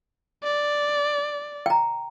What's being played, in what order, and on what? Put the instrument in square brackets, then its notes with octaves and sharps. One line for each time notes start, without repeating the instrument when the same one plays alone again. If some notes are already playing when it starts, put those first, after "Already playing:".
[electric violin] D5
[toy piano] G5 A#5